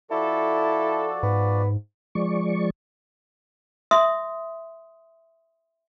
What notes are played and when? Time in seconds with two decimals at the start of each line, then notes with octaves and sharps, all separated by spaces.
0.11 F3 E4 F#4 A4 D5
1.23 G#2 B3
2.15 F3 G#3 D5 C#6
3.91 E5 C6 D#6